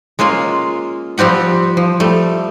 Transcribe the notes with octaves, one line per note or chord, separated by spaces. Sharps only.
G#3 A#3 C#4 F4
F3 G3 C4 G4 F#5
F3
G3 A3